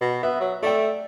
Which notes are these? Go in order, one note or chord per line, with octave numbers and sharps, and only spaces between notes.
B2
B3 E5
F#3
A3 D5 E5 G5